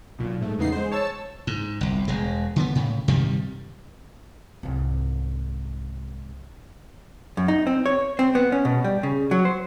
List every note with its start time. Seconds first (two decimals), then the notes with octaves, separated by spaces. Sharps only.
0.18 B1 A#2
0.41 G#2 A3
0.58 E2 C#3 B3 D#4 C7
0.72 G#3 C5
0.91 C#5 A5 E6
1.47 G#2
1.81 G1 C2
2.08 E1 G#3
2.56 D3 B3
2.75 A2 C#3
3.08 G2 C3 D#3 G3
4.63 C2 G#2
7.37 F#2
7.48 D#4
7.67 C4
7.86 C#5
8.19 C4
8.35 B3
8.52 C#4
8.65 B2
8.84 G3
9.03 C#3
9.31 F#3
9.45 C5